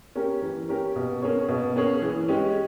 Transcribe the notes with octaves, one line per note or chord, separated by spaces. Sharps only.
A#3 C#4 G4 A#4
E3
A#3 C#4 G4 A#4
B2
A#3 C#4 G#4 C#5
B2
A#3 C#4 G#4 C#5
E3
G#3 C#4 G4